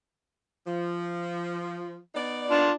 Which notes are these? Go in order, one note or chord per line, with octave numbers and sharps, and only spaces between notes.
F3
B3 D#4 D5
D4 F4